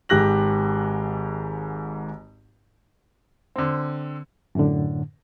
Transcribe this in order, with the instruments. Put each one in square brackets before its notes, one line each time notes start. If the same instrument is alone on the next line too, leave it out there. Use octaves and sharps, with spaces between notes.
[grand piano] G#1 G#2 G4 F#6 A#6 F#7
D3 C4
[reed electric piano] F#2 A2 D3